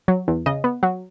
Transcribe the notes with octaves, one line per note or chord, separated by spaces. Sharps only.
F#3
E2
C#3 D#5
B3
F#3